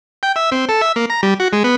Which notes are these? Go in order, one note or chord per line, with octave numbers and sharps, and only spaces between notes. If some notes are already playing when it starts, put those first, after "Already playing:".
G5
E5
C4
A4
E5
A#3
A#5
G3
F#4
G#3
B3